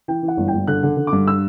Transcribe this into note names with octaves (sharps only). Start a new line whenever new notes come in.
E3 G5
E3
F#5
G1
G1 G5
D3 F#6
D3
D3
D6
G2
E6